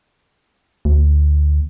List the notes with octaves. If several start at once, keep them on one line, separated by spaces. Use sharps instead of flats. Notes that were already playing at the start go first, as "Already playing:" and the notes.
D2